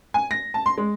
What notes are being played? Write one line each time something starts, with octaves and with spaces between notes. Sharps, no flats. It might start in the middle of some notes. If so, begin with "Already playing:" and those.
G#5
A#6
A5
C6
G#3